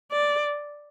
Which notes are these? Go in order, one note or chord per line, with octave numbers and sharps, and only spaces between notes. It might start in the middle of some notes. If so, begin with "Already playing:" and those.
D5